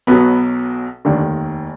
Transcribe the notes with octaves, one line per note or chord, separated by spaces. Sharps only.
B1 B2 F#3 B3
F1 D#2 D3 D#3 D4